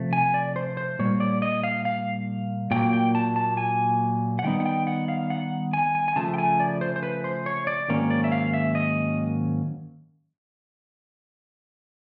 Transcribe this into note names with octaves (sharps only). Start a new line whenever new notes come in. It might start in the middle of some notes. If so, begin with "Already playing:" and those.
Already playing: C3 F3 A3
G#5
D5
C5
C5
A#2 G3 C#5
D5
D#5
F5
F5
A#2 F#3 A#3 G5
G5
A5
A5
G#5
F#5
D#3 G3 B3 D#4 G5
F#5
G5
F#5
F5
F#5
G#5
G#5
G#5
C#3 F3 A3 A5
G5
G#5
D5
C5
C5
B4
C5
C#5
D5
G#2 D#3 F#3 A#3 C#4 C#5
D5
E5
F5
E5
D#5